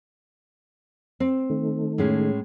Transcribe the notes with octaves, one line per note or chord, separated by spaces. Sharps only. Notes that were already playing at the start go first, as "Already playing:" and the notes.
C4
D#3 A3
A2 G#3 C#4